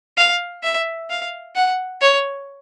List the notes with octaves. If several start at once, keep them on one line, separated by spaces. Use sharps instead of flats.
F5
E5
F5
F#5
C#5